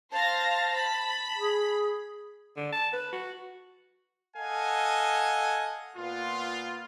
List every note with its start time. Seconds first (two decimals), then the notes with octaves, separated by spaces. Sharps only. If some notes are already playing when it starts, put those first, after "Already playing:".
0.12 C5 F5 A5 A#6
0.77 B5
1.38 G#4
2.57 D3
2.73 A5
2.93 B4
3.13 F#4
4.36 A4 D#5 F5 F#5 G#5
5.97 A#2 B3 F4